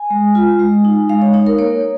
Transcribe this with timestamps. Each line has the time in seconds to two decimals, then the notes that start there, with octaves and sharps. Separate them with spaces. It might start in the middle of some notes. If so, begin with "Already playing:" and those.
Already playing: G#5
0.10 G#3
0.35 F4
0.59 G#3
0.85 D#4
1.09 G#3 F5
1.22 C#5
1.34 D#4 C#5
1.47 A#4
1.59 A#3 C#5